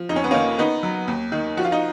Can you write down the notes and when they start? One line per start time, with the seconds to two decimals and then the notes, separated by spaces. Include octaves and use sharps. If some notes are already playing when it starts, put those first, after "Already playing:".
Already playing: F3
0.09 F2 D#4
0.16 C#4
0.24 B3
0.31 D#3 A#3 C#4
0.58 D#3 B3 D#4
0.83 F#3
1.08 D#2
1.32 D#3
1.57 F3 F#4
1.65 F4
1.72 D#4